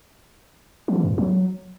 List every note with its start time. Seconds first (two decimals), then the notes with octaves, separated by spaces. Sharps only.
0.88 F3
0.96 E3
1.03 F#2
1.10 F2
1.18 F#3